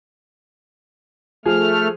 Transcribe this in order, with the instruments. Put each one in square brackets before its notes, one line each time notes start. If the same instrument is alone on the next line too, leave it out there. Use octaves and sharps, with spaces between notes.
[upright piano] F3 G#4 [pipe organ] A3 F6